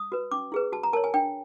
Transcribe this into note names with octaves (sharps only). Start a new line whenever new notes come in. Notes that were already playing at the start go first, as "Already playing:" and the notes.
Already playing: D#6
F#4 B4
C#4 D6
E4 G#4 B4
F#4 A5
A#5
A#4 C#5 A5
G#5
D4 G5